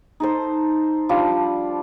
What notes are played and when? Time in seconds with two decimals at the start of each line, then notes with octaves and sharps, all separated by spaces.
0.20 D#4 A4 C5
1.09 F3 G3 D4 F4